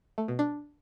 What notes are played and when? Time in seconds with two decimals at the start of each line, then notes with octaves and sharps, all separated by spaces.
0.18 A3
0.28 B2
0.39 D4